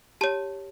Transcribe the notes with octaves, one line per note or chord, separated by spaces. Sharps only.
G4 C#5 A5